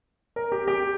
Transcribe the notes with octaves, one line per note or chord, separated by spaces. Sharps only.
A#4
G4
G4